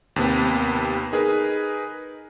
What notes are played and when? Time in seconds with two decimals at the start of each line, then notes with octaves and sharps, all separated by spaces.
0.16 D#2 C3 B3
1.13 D#4 G#4 A#4 B4